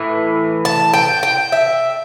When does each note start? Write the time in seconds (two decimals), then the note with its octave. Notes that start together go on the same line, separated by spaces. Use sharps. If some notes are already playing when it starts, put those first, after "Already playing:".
Already playing: A2 E3
0.65 A5
0.94 G5
1.23 G5
1.52 E5